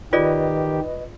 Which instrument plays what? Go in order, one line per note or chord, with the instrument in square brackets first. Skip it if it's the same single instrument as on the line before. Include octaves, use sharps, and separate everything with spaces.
[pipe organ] D#3 G4 [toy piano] F4 G#4 D5 [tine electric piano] B4 D#5